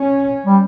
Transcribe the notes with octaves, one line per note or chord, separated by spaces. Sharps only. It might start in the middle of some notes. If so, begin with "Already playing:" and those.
Already playing: C#4
G3